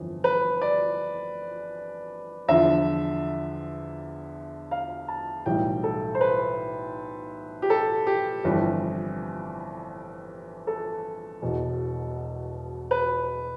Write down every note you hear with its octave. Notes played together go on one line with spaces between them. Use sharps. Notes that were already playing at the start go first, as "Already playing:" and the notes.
Already playing: G1 F2 E3
B4
D5
E2 D3 F3 E5
F5
A5
B1 A2 E3 G3 G5
A4
C5
B4
G4
A4
G4
G1 F2 E3 G3
A4
E1 E2 B2
B4